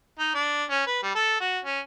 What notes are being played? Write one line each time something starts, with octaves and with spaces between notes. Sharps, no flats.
D#4
D4
C#4
B4
G3
A4
F#4
C#4